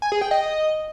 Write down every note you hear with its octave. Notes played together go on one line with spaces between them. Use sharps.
G#5
G#4
G5
D#5